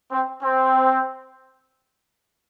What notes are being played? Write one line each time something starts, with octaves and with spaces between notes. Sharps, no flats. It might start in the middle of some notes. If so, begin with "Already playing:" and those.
C4
C4